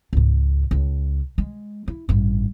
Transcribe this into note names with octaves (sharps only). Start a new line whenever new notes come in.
C#2 G#2
C#2
G#3
E4
A1 G2